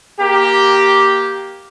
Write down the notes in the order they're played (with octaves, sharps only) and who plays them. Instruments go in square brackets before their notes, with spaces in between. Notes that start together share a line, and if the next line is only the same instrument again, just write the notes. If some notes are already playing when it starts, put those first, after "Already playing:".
[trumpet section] A#3 G4